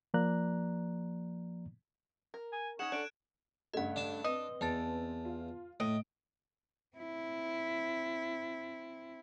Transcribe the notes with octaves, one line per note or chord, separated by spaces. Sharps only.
F3 A#3 D5 A#5 F#6
A#4
G#5
C#4 D#4 G#4 F#5 G#6 E7
D4 A4 F#6 D7
G2 C#3 A3 D#5 F#5
D4 A5
C4 B4 D#5
E2 B4 A5 A6
F4
A2 D#5 D7
C4 E4